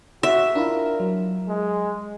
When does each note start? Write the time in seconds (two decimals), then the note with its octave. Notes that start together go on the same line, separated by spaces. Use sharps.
0.23 F#4 E5
0.55 D4 E4 F4 A#4
1.00 F#3
1.48 G#3